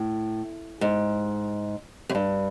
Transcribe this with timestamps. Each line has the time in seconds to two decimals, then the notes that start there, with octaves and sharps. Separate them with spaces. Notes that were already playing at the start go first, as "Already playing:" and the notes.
Already playing: A2
0.81 G#2
2.09 F#2
2.15 G2